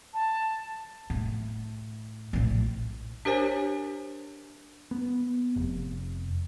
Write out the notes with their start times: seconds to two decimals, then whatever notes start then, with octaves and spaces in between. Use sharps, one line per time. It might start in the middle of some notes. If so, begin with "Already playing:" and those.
0.14 A5
1.10 A2
2.33 A#1 A2
3.25 D4 G4 A#4 C5 C#5 G#5
4.91 B3
5.56 F1